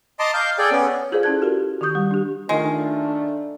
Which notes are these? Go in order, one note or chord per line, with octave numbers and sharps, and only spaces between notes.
D#5 A5 A#5 C6 D6
F5 G6
G#4 A4 D5 G5
B3 C#4
F4 G#4 A4 C5 D5 F5
C#4 E4 A4 A5 F#6 G#6
F#4 G4 A#4
D#3 G4 C#6 D#6 G6
G3
D4 G4
D#3 G#3 A3 D4 F4